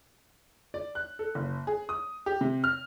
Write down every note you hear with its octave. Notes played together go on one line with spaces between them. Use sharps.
D5
F#6
A4
F#1
G#4
D#6
G4
C3
F6